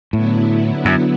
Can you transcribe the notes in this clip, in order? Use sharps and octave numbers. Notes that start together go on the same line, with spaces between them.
A2 D3 F#3 B3 E4
F#2